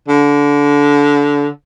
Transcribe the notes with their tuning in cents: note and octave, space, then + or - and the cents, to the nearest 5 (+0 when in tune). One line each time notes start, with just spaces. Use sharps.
D3 -25